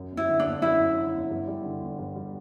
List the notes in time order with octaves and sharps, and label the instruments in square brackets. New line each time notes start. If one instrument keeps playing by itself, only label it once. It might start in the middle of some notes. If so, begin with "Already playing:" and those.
Already playing: [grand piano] F#2
G1
[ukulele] E4
[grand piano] D3
[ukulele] D4
[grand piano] G1
[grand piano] F#2 [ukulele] E4
[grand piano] G1
D3
G1
G2
G3
D3
G1
G2
G3